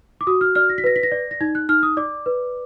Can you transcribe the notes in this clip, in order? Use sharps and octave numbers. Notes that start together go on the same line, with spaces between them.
D6
F#4 D#6
F6
D5 F6
A#6
B6
B4 A#6
B6
A#6
D5
A#6
D#4 G#6
F#6
D#4 F6
D#6
D5 D6
B4